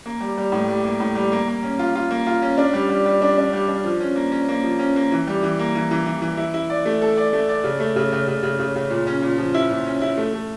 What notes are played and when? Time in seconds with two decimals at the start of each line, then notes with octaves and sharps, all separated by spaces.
0.06 A#3
0.20 G3
0.37 G3
0.52 A2
0.68 G3
0.84 A#3
1.00 A2
1.15 G3
1.32 A#3
1.48 A#3
1.63 C#4
1.79 F4
1.96 F4
2.11 A#3
2.27 F4
2.42 C#4
2.58 D4
2.73 G3
2.89 G3
3.06 G3
3.22 D4
3.38 D4
3.53 G3
3.68 D4
3.84 F3
4.01 C#4
4.16 A#3
4.32 C#4
4.49 A#3
4.63 F3
4.79 C#4
4.96 A#3
5.12 E3
5.27 G3
5.43 E3
5.59 A#3
5.75 E3
5.91 E3
6.06 E3
6.22 E3
6.37 E4
6.54 E4
6.70 D5
6.85 A3
7.02 A4
7.17 D5
7.33 A3
7.49 D5
7.64 C#3
7.80 A3
7.96 C#3
8.12 C#3
8.27 C#3
8.43 C#3
8.59 C#3
8.76 C#3
8.90 A#2
9.07 C#4
9.22 A#2
9.38 F3
9.54 E4
9.71 A#2
9.86 C#4
10.02 E4
10.17 A3
10.34 A3